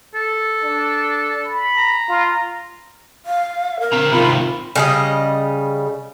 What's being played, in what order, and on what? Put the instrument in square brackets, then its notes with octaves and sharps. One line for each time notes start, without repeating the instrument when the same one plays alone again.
[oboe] A4
[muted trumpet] D4
B5
[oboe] A#5
[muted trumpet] F4
[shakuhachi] F5
A#4
[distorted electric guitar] C4 A#5
[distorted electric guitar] C3 D#3 [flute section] F4 B5
[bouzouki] C#3 G3 D#5